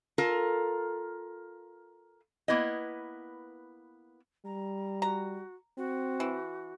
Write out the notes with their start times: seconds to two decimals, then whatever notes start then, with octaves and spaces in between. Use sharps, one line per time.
0.18 F4 A4 A#4
2.48 A#3 B3 E4 B4 D#5
4.45 G3 A#5
5.02 F#4 A#5
5.78 C4 F#4
6.20 E3